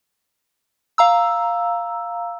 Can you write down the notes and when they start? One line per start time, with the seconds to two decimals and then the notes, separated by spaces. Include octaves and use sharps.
0.98 F5 A#5 E6